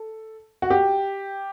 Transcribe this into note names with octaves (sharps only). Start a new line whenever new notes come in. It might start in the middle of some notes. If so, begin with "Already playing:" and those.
Already playing: A4
F#4
G4